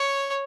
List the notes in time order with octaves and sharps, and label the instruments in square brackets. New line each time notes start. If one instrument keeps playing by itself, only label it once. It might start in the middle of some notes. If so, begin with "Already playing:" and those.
Already playing: [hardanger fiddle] C#5